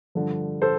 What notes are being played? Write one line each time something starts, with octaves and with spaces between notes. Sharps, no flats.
G2 D3 F3
A4 C5